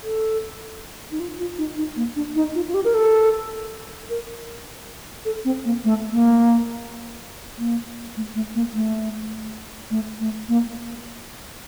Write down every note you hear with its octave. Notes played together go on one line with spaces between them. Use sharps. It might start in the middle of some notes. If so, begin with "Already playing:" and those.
A4
D#4
F4
F4
D#4
D#4
A#3
D4
D#4
F4
F4
G4
A#4
A4
A#4
A4
C4
A#3
A3
A#3
A#3
A3
A3
A#3
A3
A3
A3
A#3